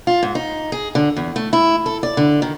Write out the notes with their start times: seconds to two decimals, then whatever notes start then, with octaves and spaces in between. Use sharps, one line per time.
0.07 F4
0.23 G#2
0.35 D#4
0.72 G#4
0.95 D3
1.16 E2
1.36 A3
1.53 E4
1.86 A4
2.03 D5
2.17 D3
2.42 D#3